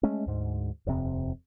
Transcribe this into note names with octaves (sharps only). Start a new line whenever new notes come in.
G#3 A3 C#4
D2 G#2
D#1 F2 C3 C4